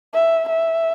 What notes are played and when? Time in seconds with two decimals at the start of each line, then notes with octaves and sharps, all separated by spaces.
0.14 E5
0.49 E5